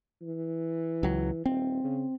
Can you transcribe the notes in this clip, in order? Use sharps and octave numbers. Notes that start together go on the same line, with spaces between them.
E3
C#2 F#3
D#1 C4
C#3